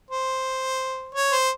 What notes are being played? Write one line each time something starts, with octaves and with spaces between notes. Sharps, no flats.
C5
C#5
C5